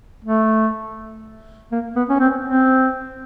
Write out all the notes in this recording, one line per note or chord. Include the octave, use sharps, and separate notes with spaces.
A3
A#3
B3
C#4
C4
C4